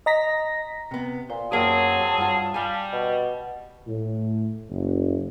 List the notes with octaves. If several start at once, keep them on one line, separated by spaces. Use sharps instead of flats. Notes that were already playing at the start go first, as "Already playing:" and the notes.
D#5 A#5 A#6 B6
C3 B3
A#2 C5
F#2 F#3 A#3 C4 G4 G#4 A5
G2 F4
G3 F5 G#5
B2
A2
F#1